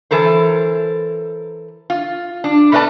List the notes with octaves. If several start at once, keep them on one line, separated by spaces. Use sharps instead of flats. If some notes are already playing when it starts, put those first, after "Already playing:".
E3 A4 A#4 C5
F4
D4
B2 A3 B4 D5 A5